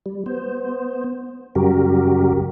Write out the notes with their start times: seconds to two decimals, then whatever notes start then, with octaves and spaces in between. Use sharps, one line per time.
0.06 G3
0.26 B3 C5
1.55 F#2 C#3 G3 F#4 G4 A#4